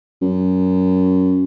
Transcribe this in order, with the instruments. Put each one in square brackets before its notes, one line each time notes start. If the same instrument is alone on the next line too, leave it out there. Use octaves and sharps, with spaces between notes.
[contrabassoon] F#2